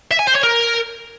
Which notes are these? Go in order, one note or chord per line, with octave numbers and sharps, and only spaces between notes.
E5
G#5
C5
C#5
A#4